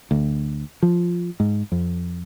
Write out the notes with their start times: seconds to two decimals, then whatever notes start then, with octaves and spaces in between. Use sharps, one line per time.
0.11 D2
0.83 F3
1.40 G#2
1.72 F2